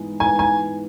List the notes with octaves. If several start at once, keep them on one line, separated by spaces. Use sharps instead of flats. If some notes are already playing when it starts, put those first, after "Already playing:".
Already playing: G#2 E3 G#3 B3
G#2 E3 G#3 B3 G#5
G#5